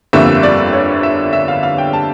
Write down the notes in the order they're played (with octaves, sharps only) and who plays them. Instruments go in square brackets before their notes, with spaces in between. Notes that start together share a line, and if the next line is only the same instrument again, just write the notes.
[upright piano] G1 F2 D3 G3 A#3 E5
D5
C#5
E5
E5
F5
F5
G5
A5